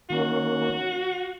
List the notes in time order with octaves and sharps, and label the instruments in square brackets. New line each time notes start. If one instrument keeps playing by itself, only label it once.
[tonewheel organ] D#3 A#3 C#4 [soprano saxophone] F#4